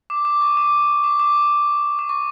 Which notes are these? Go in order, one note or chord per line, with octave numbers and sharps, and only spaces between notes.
D6
D6
C#6
D6
D6
D6
D6
C#6